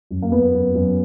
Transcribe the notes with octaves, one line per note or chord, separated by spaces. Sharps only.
F#2
A#3
F#2 B3
F#2
F#2